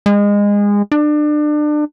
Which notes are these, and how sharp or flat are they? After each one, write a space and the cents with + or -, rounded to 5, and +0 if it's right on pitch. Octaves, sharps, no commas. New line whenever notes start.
G#3 -25
D4 +30